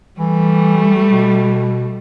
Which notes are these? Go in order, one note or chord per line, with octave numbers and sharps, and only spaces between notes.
E3 G3 A3
B2